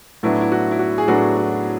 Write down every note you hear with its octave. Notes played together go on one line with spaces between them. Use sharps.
A2 F#3 B3 D4 E4
E4
F#4
E4
F#4
G#4
A2 F#3 B3 D4 F#4
F#4